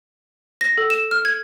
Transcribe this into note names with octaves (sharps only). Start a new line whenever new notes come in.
A#6
A4
E7
F6
G#6